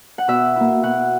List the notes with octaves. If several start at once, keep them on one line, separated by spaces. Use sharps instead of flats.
F#5
B2 E5
A#3 E4
B2 F#5